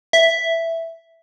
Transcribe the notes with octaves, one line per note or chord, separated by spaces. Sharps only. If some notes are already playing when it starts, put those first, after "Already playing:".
E5